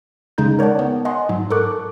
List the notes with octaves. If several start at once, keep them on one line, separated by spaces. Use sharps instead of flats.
C#3 G#3 D#4 G6
A#4 C#5 D5 F#5 A5
B3
D#5 F#5 G#5 A5 C6
G#2 F#3
A4 A#4 A5 C#6 D6 F#6